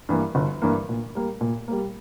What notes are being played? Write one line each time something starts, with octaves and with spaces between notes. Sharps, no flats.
G2 E3 A#3
G1
G2 E3 A#3
A#2
G3 A#3
A#2
G3 A#3